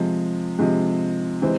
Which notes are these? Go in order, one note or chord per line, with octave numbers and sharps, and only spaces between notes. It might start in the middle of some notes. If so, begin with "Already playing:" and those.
Already playing: C3 F3 G#3
C3 F3 G#3
C3 E3 G#3 C4